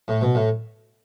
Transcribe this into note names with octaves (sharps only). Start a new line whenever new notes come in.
A2
B2
A2